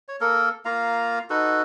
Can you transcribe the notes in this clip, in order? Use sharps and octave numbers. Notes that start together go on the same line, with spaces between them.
C#5
A#3 A4 A#4
A#3 F4 F5 A#5
D#4 F#4 A4 B4